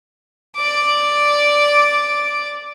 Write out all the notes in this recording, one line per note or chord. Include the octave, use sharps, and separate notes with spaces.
D5 D6